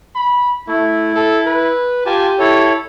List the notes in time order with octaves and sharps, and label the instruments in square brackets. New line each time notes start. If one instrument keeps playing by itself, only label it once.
[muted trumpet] B5
[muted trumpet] A3 [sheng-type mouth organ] E4
[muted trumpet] A4
B4
[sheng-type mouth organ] F4 G#5 A5 [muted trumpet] G4
[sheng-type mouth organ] E4 A4 C#5